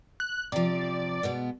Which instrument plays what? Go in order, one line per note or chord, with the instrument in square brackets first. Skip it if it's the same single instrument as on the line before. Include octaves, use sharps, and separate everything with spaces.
[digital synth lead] F#6
[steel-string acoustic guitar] C3 F3 [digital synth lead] D5
[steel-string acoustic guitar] B2 G#3 B3